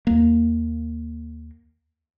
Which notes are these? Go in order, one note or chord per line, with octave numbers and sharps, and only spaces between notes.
D#2 A#3